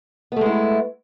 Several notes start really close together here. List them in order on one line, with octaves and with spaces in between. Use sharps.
B3 A3 G#3 E4